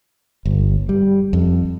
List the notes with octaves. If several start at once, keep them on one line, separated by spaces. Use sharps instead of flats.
G1
G3
F2